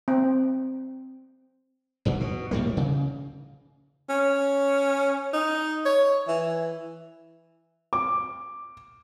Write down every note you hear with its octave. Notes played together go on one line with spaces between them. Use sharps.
C4
G#1 E2 G#2 F#3
B2
F2 A2 G3 A#3
C#3
C#4
D#4
C#5
E3
D6